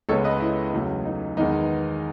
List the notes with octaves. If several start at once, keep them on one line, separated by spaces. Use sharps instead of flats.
C#2 C#3 G#3 B3 A4 C#5
B4 D#5
E4
E2 C#3 F#3 A3
D#4
E2 D#3 G#3 B3 D#4